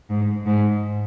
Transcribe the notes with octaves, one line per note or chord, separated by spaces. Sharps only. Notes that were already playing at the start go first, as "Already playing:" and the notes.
G#2
G#2